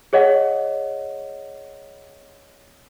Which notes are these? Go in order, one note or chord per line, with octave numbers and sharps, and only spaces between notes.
G#4 C#5 D#5 F#5